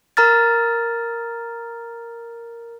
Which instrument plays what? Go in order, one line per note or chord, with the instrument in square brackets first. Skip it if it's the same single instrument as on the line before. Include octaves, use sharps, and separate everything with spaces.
[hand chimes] A#4 A#5 F6 A6